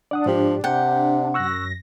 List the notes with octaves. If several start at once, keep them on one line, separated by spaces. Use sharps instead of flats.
D4 D5 F#5 D#6
G#2 F3 G4
C3 F#5 G5 G6
F#2 C#6 E6 F#6 A#6